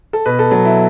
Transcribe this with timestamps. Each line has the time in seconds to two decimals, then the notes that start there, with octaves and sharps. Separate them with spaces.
0.13 A4
0.26 B2 B4
0.39 A4
0.51 F#3 A4
0.65 E4